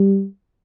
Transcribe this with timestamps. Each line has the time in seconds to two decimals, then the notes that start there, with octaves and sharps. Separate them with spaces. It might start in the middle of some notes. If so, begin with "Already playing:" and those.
Already playing: G3